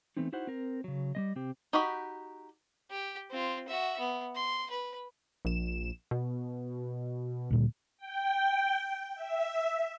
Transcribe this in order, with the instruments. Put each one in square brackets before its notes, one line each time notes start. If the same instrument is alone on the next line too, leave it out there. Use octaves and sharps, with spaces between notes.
[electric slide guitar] E3 A3 B3 C4 D#4
D#4 E4 F#4 C5 F#5
C4 A#4
C#3 F#3
G3 G#3 D#5
C3 C4 G4
[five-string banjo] D#4 F#4 G4 B5
[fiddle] G4
C4 F4
F#4 E5
B3
C6
B4
[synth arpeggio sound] A#1 E7
B2
[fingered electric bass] D2 A#2 G3
[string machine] G5
E5